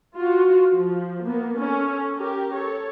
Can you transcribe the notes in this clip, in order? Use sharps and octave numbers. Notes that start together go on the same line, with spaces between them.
F4 F#4
F3
A#3 B3
C#4 A4
G4 A#4
A4 C#5